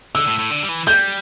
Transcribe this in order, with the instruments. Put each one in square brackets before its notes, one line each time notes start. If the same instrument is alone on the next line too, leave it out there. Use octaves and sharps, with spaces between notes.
[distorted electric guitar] D3 [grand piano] E6
[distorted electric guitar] A2
A2
D3
G3
E3
[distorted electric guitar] G3 [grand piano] G6